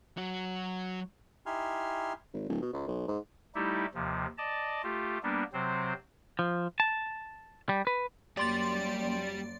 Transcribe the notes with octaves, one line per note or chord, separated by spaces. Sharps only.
F#3 F#4
D#4 E4 G4 G#5 C6 F6
G#1
D1
B2
C#2
B1
G#2
G3 A3 D#4 E4 G4
D#2 C3 F3
D5 D#5 A5
A3 F4 G4
G3 A#3 B3 D4
C3 F#3 C4 C5
F3
A5
G3
B4
F#2 G3 A#3 G4 D5 C6 A6